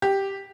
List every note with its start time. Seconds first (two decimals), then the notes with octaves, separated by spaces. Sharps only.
0.02 G4